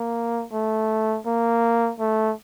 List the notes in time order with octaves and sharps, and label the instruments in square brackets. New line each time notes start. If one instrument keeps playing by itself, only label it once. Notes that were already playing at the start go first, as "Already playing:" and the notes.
Already playing: [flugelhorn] A#3
A3
A#3
A3